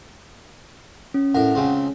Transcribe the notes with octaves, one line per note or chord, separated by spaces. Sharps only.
C#4
A2 A#4 F#5
C#2 C#3 C4